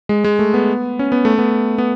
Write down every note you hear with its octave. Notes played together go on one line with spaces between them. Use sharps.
G#3
G#3
A3
B3
C#4
B3
A3
B3
B3